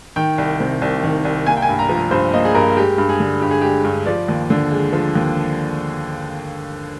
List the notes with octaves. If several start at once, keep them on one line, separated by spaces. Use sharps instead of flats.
D#3 G5
C2
C3
C2
D#3
C2
A#3 G#5
G5
G#5
G2
A#5
F3
A#5
G2 C5
A#3 D#5
G#4
G2 A#4
G#3 G4
G2
G#4
D3
G2 G4
G#4
G#3 G4
G2
F3 D5
D#2
D3
G#3
F3
D#2